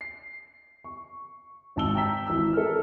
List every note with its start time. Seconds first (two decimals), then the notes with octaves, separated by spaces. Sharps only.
0.01 C7
0.84 C#6
1.76 G#1 G#2 A5 E6 G7
1.95 G5 A#5 E6 B6
2.27 G#1 E3 E6
2.53 A4 A#4 F6